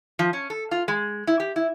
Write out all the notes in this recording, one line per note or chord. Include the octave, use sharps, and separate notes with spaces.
F3
C#4
A4
F4
G#3
E4
G4
E4